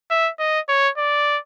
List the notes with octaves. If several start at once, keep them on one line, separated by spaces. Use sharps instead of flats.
E5
D#5
C#5
D5